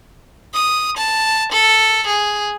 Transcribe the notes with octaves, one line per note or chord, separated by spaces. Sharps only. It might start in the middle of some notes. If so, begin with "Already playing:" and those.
D#6
A5
A4
G#4